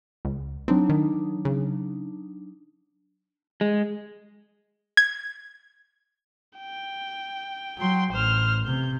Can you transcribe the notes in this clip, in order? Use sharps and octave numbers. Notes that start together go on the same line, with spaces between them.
C#2
F#3 C4 D4 D#4
D#3
C#3
G#3
G#6
G5
F#3 G5 C6
A1 C5 F6
C3 G6